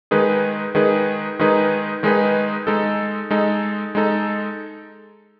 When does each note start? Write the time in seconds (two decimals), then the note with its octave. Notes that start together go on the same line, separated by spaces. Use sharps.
0.11 D#3 G#3 D#4 G#4 B4
0.75 D#3 G#3 D#4 G#4 B4
1.39 D#3 G#3 D#4 G#4 B4
2.03 D#3 G#3 D#4 G#4 B4
2.67 G#3 D#4 A4
3.31 G#3 D#4 A4
3.95 G#3 D#4 A4